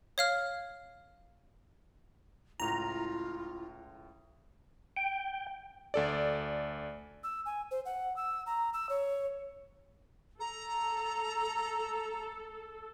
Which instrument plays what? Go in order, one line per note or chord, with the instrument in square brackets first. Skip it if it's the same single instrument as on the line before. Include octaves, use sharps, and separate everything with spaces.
[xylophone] C#5 F5 F6
[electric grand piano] C#2 A2 [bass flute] E4 [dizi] F4 [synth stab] A#5
[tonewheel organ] G5
[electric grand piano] D2 A4 D5
[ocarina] E6
G#5
C5
F#5
E6
A#5
E6
C#5
[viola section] A4 [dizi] A#5